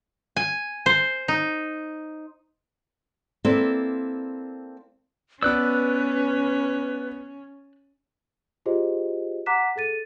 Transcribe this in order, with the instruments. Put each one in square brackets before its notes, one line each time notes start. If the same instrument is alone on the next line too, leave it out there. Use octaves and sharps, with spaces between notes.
[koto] G#5
C5
D#4
[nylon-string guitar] A#3 C4 E4 A4 B4 D5
[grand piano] B3 D5 [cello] C#4 [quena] B4 [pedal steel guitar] E6 F#6
[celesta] F4 G4 G#4 C5 D#5
F#5 A#5 D6 F#6 B6 E7
G#4 A4 A6 D#7